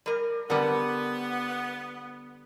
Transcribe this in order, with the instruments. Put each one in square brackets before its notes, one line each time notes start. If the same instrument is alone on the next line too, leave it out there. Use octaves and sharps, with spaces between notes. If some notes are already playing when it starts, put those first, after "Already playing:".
[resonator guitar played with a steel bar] G3 A#4
[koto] D3 G3 [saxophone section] B3 [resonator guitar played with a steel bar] A#4 B4 F#5